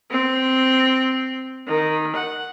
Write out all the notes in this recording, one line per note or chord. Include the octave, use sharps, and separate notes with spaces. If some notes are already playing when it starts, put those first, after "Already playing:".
C4
D#3
F#5